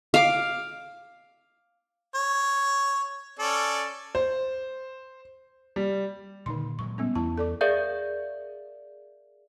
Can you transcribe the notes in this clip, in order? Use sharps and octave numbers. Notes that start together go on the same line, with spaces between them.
F5 D6
C#5
C#4 A4 D5
C5
G3
A#2 D3 D#3 D#4 C6
A#2 F#3 G#3 C#6
G3 B3 C#4
E2 E4 A5
A4 D5 D6
G#4 A#4 D5 E5 F5 G6